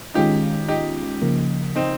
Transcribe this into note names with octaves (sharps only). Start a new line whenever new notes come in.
D#3 G#3 C#4 D#4 F4 G4
D#4 G4
C#3 F3 A#3
C4 D#4